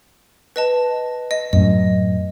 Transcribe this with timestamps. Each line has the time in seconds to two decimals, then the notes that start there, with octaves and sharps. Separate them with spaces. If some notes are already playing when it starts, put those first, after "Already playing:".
0.56 B4 D#5 A5
1.31 D#5
1.53 F#2 A2 D#5